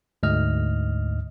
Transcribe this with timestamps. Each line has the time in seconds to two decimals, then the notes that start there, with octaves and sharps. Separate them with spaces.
0.23 D2 G#2 D#5 F6